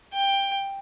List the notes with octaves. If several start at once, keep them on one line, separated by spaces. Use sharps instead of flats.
G5